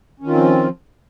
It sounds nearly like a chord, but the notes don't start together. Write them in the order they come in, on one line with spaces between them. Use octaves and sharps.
C#4 D#3 F4 C4 F3